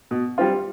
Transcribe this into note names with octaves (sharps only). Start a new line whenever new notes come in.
B2
G3 C4 F4